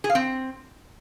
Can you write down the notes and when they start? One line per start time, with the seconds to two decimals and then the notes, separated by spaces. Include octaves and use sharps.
0.04 G#4
0.10 F5
0.15 C4